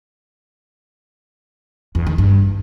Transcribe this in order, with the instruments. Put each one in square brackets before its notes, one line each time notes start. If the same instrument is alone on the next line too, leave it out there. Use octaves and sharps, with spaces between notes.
[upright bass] E2
D#3
G2